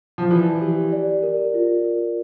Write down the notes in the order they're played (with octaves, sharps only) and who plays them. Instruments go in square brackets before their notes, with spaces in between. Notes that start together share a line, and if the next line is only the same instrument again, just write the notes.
[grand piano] F3
[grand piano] E3 [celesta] D5
[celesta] G4
D5
A#4
F4
A#4